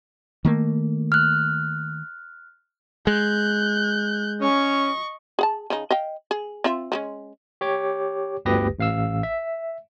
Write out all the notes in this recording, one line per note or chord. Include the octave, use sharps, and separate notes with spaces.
D#3 A3 A#3
F6 F#6
G#3 F#6 G6
C#4 D#5 C#6
G#4 F#5 A5
C#3 D#4
D#5 F5 G5
G#4
C4 F4 E5
F3 G#3 C#4
G4 C#5 D6
G1 D2 G4 B4 D#6 A#6
A1 F5 E6
E5